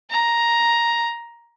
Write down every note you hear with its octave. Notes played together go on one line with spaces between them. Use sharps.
A#5